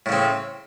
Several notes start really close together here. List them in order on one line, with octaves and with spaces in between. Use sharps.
A2 C#3 C4